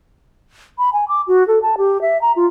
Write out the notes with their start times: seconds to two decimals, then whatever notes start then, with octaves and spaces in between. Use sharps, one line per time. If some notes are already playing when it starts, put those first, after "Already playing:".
0.78 B5
0.93 G#5
1.08 D6
1.28 F#4
1.48 A4
1.63 A5
1.78 G4
2.02 E5
2.21 A#5
2.36 F4